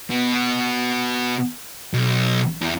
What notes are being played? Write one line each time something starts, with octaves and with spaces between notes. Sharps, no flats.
B2
B1
E2